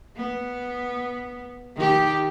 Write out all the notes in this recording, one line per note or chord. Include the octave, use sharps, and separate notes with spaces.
B3
D#3 G4